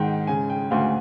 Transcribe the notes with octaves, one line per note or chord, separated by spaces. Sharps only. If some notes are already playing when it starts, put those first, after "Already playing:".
Already playing: G#2 D#3 F#5 G5
C#3 G#5
G5
D2 F5